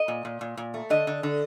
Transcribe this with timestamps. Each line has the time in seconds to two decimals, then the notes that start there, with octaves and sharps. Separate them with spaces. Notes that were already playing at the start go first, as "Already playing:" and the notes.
Already playing: D#5
0.08 A#2
0.25 A#2
0.41 A#2
0.57 A#2
0.74 A3
0.90 D3 D#5
1.07 D3
1.23 D3